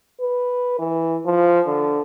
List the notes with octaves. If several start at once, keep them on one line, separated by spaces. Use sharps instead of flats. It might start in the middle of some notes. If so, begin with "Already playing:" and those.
B4
E3
F3
D3